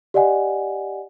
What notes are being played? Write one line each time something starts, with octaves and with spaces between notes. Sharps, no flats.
G4 D5 D#5 F#5 G#5